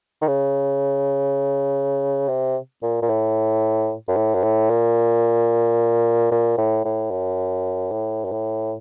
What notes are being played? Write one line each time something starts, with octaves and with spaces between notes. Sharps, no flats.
D#3
C#3
C3
A#2
A#2
A2
F#2
A2
F#2
A2
A#2
A#2
A2
A2
F#2
A2
F#2
A2